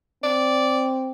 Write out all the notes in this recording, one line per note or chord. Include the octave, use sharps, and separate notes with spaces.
C4 D5